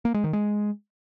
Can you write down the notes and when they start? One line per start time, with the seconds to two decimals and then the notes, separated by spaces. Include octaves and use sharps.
0.05 A#3
0.14 G#3
0.24 D#3
0.33 G#3